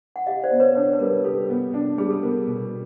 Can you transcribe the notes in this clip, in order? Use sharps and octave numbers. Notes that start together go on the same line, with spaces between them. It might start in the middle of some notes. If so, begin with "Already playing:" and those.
F#5
G4 D#5 F5
C5 D5
B3
B4 C#5
D4 B4
B4
G3 A#4
G4 A4
B3
D4
G3 G#4
A4
B3 A#4
B2